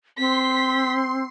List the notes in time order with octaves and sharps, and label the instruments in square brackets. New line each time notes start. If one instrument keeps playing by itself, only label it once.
[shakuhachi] C4 [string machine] C6 [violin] B6